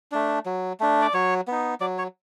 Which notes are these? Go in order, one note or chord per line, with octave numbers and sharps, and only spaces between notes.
A3 D4
F#3
A3 D4
D5
F#3 C#5
B3 D#4
F#3 D5
C#5